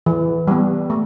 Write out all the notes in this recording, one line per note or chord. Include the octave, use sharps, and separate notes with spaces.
E3
G3 B3
A3